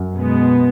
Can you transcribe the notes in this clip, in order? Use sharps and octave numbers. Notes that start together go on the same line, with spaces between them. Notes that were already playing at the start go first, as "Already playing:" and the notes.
Already playing: F#2
B2 G#3 B3